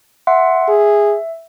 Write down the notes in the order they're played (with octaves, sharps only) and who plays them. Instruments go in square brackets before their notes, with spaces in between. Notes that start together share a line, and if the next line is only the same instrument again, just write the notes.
[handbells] E5 F#5 C6
[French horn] G#4 [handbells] E5